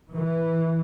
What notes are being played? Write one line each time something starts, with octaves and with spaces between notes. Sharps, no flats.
E3